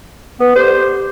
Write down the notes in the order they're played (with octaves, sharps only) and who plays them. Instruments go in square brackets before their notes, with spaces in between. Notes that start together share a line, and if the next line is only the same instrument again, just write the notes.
[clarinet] B3 [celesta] B4
[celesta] G4 D6 [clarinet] C5